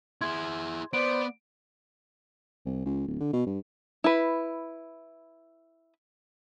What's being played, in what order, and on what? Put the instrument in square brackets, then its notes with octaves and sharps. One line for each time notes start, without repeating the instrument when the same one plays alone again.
[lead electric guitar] E4 G#4 [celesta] C6 G#6
[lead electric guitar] B3 [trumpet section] C5 D5 [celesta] D7
[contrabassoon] C2
C#2
D1
D3
B2
G2
[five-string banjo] E4 B4